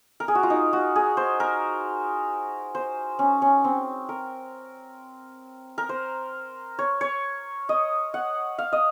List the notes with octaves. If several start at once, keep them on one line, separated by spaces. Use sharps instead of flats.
A#4
G#4
F#4
F4
D#4
F#4
G#4
C5
A#4
C5
C#4
C#4
C4
A#4
A#4
C5
C#5
C#5
D#5
F#5
F5
D#5